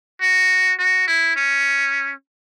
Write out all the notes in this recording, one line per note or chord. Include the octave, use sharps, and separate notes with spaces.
F#4
F#4
E4
C#4